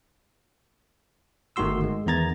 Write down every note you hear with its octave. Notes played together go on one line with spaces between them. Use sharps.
G1 D#3 A3 F#4 C6 E6
G#3
E2 D#3 B3 A#5 G#6 A6